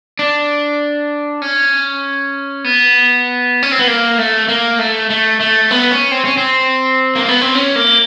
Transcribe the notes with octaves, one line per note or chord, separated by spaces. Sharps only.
D4
C#4
B3
C#4
C4
B3
A#3
A3
A#3
A3
A3
A3
B3
C#4
C4
C#4
C4
A#3
B3
C4
C#4
A#3